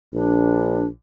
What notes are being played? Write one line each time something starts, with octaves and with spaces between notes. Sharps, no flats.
A#1 D4